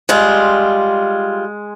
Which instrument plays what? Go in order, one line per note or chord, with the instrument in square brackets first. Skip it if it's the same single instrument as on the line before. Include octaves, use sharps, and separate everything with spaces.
[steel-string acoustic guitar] G3 F4 [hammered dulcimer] G#3